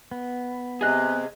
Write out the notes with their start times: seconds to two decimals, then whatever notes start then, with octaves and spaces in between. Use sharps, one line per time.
0.11 B3
0.81 C3 G#4 D#5 G#5 F#6